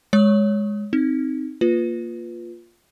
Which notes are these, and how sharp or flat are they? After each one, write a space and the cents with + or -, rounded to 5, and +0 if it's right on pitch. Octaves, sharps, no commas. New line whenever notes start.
G#3 +0 C#5 +10 D#6 +30
C4 +0 D#4 +0
A#3 +0 F4 +0 B4 +0